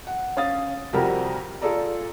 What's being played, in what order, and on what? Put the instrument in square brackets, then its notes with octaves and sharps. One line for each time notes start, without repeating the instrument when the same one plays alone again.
[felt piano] F#5
C#4 F5 D#6 A6
F2 C3 G3 F#4 G4 A#4
F4 G#4 A4 D5 A#5